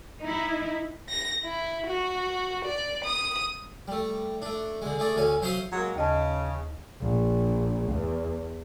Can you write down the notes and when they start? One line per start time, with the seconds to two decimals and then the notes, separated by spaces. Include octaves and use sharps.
0.22 D#4 E4
1.09 A#6
1.44 E4
1.86 F#4
2.65 D5
3.05 D#6
3.88 G3 A3
4.42 A3 D4
4.82 D3 G#3
4.99 A3 G#4 D5
5.16 D2 D3 C#4 G#5
5.42 F#3 C5 E5 F5 C6 D#6
5.73 F#3 G#3 A#3
5.96 D#2 C#3 D#5 A5
7.01 A#1
7.92 E2